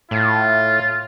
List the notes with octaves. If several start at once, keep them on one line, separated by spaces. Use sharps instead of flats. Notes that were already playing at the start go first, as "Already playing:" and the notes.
A2 F4